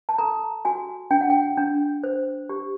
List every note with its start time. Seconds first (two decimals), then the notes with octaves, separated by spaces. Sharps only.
0.09 A5
0.18 A4 A#5
0.65 F#4 G#5
1.11 D4 G5
1.21 F#5
1.30 G5
1.57 D4
2.04 C5
2.49 G4